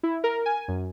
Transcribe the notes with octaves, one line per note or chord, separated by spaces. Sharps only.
E4
A#4
G#5
F#2